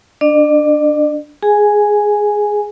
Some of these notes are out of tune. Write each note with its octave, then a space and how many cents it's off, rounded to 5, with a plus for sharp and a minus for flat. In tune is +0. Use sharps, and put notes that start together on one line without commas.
D4 +0 D5 +45
G#4 +0 G#5 +0